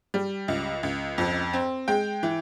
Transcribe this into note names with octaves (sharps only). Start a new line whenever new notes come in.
G3
C#2
C#2
F2
C4
G#3 G5
E3